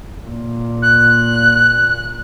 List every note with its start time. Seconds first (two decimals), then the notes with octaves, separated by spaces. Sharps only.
0.24 A#2
0.82 F#6